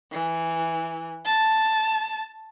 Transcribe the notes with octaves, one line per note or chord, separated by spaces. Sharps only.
E3
A5